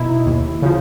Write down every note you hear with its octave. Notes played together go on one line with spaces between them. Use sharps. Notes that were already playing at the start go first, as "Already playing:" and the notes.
Already playing: B2 D#4 E4
D#2
C#3 F3